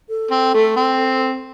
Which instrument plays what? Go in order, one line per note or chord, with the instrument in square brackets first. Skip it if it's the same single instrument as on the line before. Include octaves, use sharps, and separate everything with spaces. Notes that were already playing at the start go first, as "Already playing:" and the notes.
[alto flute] A4
[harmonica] C4
A3
C4